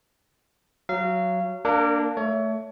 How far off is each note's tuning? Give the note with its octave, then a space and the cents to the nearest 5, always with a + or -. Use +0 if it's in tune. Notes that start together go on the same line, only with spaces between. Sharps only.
F#3 +0 F5 -30
A#3 +0 D4 +0 A#4 -40
A3 +0 C#5 +30